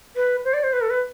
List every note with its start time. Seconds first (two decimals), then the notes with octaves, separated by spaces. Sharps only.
0.16 B4
0.45 C5
0.54 D5
0.63 C5
0.73 B4
0.81 A4
0.90 B4